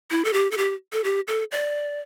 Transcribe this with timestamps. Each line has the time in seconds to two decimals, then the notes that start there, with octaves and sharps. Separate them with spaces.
0.11 E4
0.25 A4
0.33 G4
0.51 A4
0.57 G4
0.93 A4
1.04 G4
1.28 A4
1.52 D5